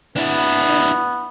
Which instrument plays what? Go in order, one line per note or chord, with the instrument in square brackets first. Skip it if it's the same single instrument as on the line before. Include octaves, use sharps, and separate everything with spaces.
[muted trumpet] B3 [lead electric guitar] D4 E4